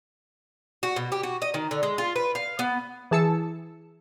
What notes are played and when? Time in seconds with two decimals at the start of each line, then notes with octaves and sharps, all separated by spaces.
0.83 F#4
0.96 B2
1.12 G4
1.23 F#4
1.42 D#5
1.54 D#3
1.71 D3
1.83 G#3
1.98 F4
2.16 B4
2.35 F5
2.59 B3
3.11 E3 G#4 A5 E6 C#7 E7